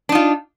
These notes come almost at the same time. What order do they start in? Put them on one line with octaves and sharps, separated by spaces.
D4 D#4 F4